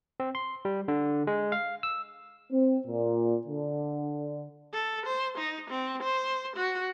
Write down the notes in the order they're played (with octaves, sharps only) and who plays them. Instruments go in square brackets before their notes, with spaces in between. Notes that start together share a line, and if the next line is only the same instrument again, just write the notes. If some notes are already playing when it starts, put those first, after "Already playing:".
[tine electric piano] C4
C6
G3
D3
G#3
F5
E6
[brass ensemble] C4
A#2
D3
[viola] A4
C5
D#4
C4
C5
F#4